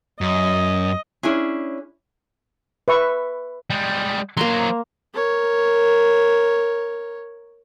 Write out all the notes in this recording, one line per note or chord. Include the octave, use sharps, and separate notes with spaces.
F#2 D#5
C#4 D4 E4 G#4
B4 E5 C#6
G3 G#3
F#3 A#3 C5 A#5 C6
A#4 C#5